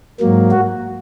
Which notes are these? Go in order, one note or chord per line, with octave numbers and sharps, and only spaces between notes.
G#2 F#3 A#3
F#4